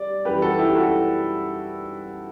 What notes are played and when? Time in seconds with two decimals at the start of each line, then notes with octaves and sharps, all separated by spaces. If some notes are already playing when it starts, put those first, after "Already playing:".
Already playing: G3 D5
0.25 F#2 E3 G3 G4 B4
0.42 F#4 A4
0.59 E4 G4
0.75 F#4 A4